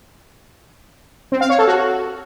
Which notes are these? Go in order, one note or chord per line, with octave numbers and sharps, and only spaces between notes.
C4
F5
C#5
A4
F#4